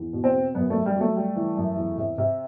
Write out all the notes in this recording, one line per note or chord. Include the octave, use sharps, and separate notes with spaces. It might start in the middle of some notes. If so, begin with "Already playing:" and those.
Already playing: E2
B2
C4
B2
F#2 B3
F#2 A3
G3
F#3
A3
G3
E3
F#2
E2
C3
C3